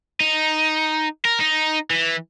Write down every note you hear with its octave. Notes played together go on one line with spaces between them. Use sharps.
D#4
A#4
D#4
E3